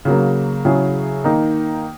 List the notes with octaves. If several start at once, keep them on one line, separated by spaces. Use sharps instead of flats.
C#3 F#3 A#3
C#3 F#3 C#4 E4 G#4
D#3 A#3 D#4